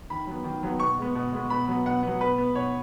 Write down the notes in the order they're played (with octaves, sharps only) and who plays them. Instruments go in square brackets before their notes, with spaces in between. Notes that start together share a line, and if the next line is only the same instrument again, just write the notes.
[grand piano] D#3 B5
F#3 B3
D#3
F#3 B3
B2 C#6
G#3 B3
B2
G#3 B3
B2 B5
F#3 B3
B2 F#5
F#3 B3
B2 B4
B3
B2 C#5